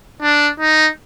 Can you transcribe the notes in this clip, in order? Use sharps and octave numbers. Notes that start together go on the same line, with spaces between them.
D4
D#4